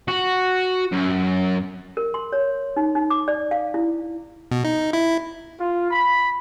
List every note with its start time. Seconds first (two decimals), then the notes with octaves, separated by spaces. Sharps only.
0.08 F#4
0.92 F#2
1.97 A#4
2.14 C6
2.32 C#5
2.77 D#4
2.95 D#4
3.10 D6
3.28 D5
3.51 F5
3.74 E4
4.52 B2
4.64 D#4
4.93 E4
5.59 F4
5.91 B5